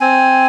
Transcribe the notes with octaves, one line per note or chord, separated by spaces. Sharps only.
C4 G#5